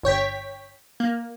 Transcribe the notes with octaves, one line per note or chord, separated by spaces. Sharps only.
G1 C#5 G5 B6
A#3